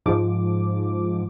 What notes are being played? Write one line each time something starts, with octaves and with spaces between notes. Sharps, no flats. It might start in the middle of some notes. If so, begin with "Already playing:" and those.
G#2 F3 D6